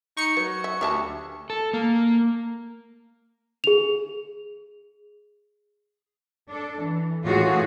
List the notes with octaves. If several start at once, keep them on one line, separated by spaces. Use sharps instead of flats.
D#4 C#6 C#7
F#3 B4
E5
D2 G4 E5 A5
A4
A#3
G#4 F7
D4 A4
E3
A2 E3 C#4 F4 F#4 G#4